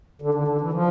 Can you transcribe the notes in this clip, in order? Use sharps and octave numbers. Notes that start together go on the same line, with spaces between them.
D3
D3
D3
E3
F3